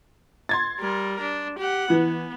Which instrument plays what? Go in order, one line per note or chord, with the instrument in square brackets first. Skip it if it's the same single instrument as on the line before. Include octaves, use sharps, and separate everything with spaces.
[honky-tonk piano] C6 G#6 A6
[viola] G3 A#4
D4
G4 F#5
[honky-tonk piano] E3 [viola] B3